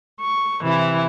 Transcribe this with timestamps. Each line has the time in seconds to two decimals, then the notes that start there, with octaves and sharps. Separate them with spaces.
0.20 C#6
0.61 C3 E3 E4